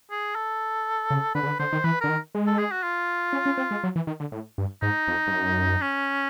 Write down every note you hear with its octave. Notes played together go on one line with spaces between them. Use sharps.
G#4
A4
C#3
D3 B4
C#3
D3
D3 C5
D#3
E3 B4
D3 A#4
D#3
G#3
A4
G#4
F#4
F4
C#4
C#4
C4
G#3
F#3
E3
D#3
D3
A2
G2
G#2 D#4
F2
G2
F#2
C#4